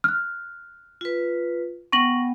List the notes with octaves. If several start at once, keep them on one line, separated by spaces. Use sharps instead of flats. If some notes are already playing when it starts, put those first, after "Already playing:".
F6 F#6
F4 B4
B3 F#5 G5 C#6 A#6 F#7